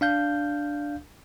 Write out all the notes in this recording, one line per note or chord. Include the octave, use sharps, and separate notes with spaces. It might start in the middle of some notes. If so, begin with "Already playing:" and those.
D4 F5 G6